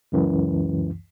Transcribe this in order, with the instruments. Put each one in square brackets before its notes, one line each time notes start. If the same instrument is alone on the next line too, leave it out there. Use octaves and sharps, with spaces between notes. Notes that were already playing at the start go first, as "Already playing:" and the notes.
[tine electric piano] C#2 F#2 E3